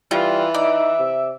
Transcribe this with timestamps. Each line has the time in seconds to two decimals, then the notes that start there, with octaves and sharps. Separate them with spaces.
0.11 E3 G3 F4
0.54 D#4 D5 E5
0.99 C3